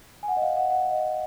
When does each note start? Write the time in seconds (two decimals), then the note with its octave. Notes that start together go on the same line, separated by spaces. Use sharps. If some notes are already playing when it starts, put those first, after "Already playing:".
0.23 G#5
0.28 F#5
0.37 D#5
0.42 F5
0.57 F#5
0.70 F#5
0.91 D#5